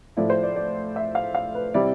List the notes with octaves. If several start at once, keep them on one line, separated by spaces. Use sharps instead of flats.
A2 F3 A3 E4 D5
C5
D5
D5
E5
F5
F5
B4
C3 G3 C4 E4 D5